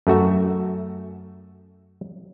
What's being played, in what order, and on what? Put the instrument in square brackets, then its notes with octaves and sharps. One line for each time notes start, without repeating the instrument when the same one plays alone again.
[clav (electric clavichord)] F#2 A3 F#4 E5